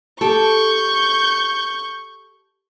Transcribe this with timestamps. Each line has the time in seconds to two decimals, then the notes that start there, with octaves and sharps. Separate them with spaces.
0.21 G4 A4 C#6 G6